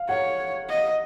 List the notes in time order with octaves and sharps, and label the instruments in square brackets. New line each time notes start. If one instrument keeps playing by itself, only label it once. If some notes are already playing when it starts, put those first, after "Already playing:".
Already playing: [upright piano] F5
[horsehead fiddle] C#5 [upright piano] F#5
[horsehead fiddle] D#5